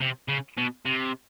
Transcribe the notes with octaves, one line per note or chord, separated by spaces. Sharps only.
C3
C#3
B2
C3